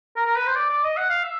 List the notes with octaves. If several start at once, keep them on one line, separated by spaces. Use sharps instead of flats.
A#4
A#4
B4
C5
D5
D5
D#5
F#5
F5
E5